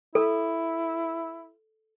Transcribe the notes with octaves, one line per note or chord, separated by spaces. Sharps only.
E4 A4